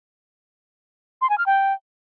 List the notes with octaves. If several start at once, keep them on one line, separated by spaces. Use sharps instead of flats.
C6
G#5
F6
G5